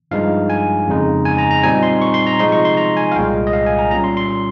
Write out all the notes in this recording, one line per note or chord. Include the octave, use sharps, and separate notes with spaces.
G2 F3 G#3 D#4 F5
G#5
F2 C#3 G#3 D#4
G#5
A#5
A#5
A#2 G3 C4 D#4 G#5
C6
C#6
C6
A#5
C3 F3 G#3 D#4 C6
C#6
C6
A#5
G#5
F5
C2 A#2 G#3 G5
D#5
F5
G#5
A#5
A#2 G3 C#4 A#5
C6
C6